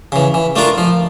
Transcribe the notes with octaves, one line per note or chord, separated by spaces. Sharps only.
C#3 E3
E3
A3 D4 F4 A#4
F3